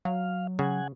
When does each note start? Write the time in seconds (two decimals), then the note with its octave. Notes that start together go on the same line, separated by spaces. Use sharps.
0.05 F#3 F5
0.59 C#3 F#5 G#5